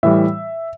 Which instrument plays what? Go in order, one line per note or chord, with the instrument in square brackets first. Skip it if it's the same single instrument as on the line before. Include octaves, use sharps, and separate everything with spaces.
[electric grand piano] A2 E3 G3 E5